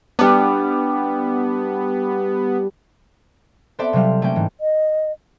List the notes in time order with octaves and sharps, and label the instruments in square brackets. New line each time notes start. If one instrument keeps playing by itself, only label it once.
[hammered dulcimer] G3 D4 [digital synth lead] B3
[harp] B3 C4 A4 C5 D5 E5
C3 F#3 G3 F5
A3 A#3 C4 C#4 G5
G#2 E3
[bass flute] D#5